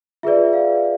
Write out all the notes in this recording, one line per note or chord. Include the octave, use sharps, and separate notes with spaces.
F4 G#4 B4 D5 E5
F5